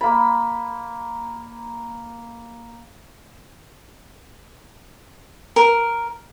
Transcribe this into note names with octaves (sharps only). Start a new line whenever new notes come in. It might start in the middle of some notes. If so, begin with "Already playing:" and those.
A#3 B5
A#4